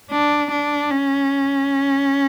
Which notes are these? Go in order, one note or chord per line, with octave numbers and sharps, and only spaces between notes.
D4
D4
C#4